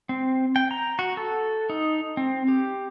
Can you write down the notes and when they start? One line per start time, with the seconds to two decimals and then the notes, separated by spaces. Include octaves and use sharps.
0.09 C4
0.56 G5
0.71 A#5
0.99 F#4
1.17 A4
1.70 D#4
2.17 C4
2.48 G4